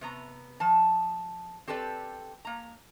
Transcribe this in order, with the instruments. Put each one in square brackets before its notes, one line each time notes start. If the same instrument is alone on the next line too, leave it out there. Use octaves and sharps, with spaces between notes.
[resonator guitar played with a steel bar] C3 B3 A#5
F3 A5
C4 G4 A4 B4 D5
A#3 A#5